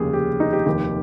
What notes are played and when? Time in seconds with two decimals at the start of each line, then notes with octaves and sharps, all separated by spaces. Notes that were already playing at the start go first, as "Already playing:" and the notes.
Already playing: F1 D#2 C#3 G4 G#4
0.13 G4
0.40 D#4
0.53 G4
0.66 F1 D#2 D#3 G4